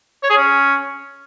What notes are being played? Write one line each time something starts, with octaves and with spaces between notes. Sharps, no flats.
C#5
G#4
C#4